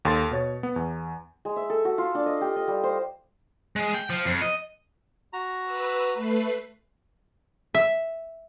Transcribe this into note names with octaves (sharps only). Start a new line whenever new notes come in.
D#2 A4 C6 A6
B2 C#5 A6
B3
E2
G#3
E5
A4
F#4
F4
D4
D#5
G4
D#5
G3
C5
G#3
G5
F3
F2
D#5
F#4 A#5
B4 E6
A3 B4 C7
E5